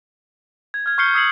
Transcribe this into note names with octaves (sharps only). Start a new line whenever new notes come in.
G#6
F6 G#6
C#6 F6 G6 C7 C#7 G7
D#6 E6 G#6 C7 C#7 F#7